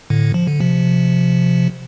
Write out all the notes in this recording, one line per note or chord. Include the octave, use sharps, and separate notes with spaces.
A2 D3
F3
D3
C3 F3